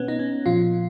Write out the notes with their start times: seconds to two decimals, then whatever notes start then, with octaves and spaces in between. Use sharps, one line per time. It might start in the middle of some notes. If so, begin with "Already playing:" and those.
Already playing: B2 B3 C#4
0.08 D#4
0.19 C#4
0.46 A#2 F3 F4